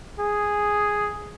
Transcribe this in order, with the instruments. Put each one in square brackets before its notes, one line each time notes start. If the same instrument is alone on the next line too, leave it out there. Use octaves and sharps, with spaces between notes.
[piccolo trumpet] G#4